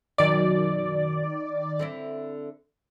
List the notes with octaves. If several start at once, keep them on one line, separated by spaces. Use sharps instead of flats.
F#2 B2 D#3 F#3 D5
D3 C4 E4